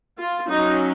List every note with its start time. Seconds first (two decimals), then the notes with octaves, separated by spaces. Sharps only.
0.17 F4
0.48 F#3 C#4 D#4